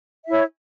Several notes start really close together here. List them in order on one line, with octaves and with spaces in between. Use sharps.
E5 E4 C#5